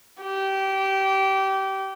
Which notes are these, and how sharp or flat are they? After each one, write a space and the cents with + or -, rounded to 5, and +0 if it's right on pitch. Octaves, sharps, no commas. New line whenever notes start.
G4 -20